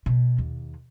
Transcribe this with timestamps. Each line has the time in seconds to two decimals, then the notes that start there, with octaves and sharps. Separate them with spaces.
0.06 B2
0.38 D#2